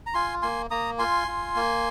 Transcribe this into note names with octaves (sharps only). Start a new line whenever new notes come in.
A#5
F4 G#5 C6
A#3 G#5 C6
A#3 A#5 D#6
F4 G#5 C6
F4
A#3